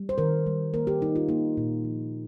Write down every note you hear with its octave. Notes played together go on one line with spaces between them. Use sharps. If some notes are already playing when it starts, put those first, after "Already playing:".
Already playing: G3
C5
D#3 A#4
G3
A#3 A#4
G4
G3 D#4
F4
A#3 D#4
A#2
F3